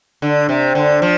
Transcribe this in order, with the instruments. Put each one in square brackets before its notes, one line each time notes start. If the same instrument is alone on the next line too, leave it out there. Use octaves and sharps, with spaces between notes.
[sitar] D3
C3
D3
F3